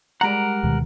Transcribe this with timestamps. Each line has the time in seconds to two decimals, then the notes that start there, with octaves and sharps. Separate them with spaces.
0.21 G3 G#3 A#4 F#5 A#5
0.63 D2 B2 D#3